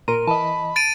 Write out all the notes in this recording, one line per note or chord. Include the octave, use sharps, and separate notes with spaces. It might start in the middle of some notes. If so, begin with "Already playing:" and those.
A#2 A#4 A#5 C6 D#7
E3 D#5 A5 B5
A6 D7 D#7